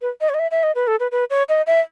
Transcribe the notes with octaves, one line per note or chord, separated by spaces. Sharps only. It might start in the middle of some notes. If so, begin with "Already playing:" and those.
B4
D#5
C#5
D#5
E5
E5
D#5
B4
A4
B4
B4
C#5
D#5
E5